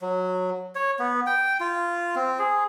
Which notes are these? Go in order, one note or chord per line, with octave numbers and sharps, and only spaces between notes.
F#3
C#5
B3
G5
F4
C4
G#4